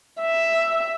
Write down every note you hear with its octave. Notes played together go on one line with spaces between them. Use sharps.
E5